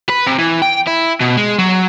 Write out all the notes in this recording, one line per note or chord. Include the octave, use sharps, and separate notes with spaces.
B4
C3
E3
G5
E4
B2
G#3
F#3